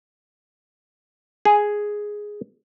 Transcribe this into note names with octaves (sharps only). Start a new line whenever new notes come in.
G#4